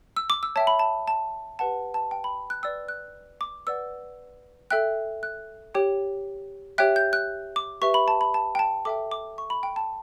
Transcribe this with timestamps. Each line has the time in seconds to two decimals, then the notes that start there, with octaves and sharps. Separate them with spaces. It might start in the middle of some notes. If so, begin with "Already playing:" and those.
0.17 E6
0.30 D6
0.43 E6
0.56 C#5 E5 G5 A5
0.67 B5
0.79 A5
1.08 A5
1.59 G4 B4 F#5 A5
1.94 A5
2.11 G5
2.24 B5
2.50 F#6
2.63 B4 D5 G5 E6
2.89 F#6
3.41 D6
3.67 B4 D5 F#5 E6
4.71 A4 E5 G5 F#6
5.23 F#6
5.75 G4 C#5 G5
6.78 G4 C#5 E5 G5 F#6
6.96 G6
7.13 F#6
7.56 D6
7.82 G4 B4 E5 C#6
7.94 B5
8.08 A5
8.21 B5
8.34 A5
8.55 G5
8.59 A5
8.85 A4 E5 G5 D6
9.11 D6
9.38 C#6
9.50 B5
9.63 G5
9.76 A5